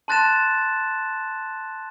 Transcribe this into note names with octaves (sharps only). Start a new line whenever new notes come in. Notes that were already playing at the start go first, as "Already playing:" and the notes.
A5 C6 F#6 A6 A#6 E7